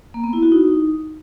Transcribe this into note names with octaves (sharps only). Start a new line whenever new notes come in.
A#3
B3
E4
F#4
D#4